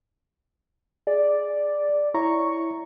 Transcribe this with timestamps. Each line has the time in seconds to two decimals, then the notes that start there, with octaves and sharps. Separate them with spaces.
1.07 G#4 D5
2.14 E4 C#5 A#5 C#6